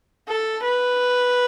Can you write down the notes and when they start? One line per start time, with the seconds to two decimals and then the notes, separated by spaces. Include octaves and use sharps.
0.28 A4
0.63 B4